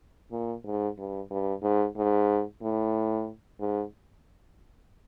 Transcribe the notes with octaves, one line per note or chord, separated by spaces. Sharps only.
A#2
G#2
G2
G2
G#2
G#2
A2
G#2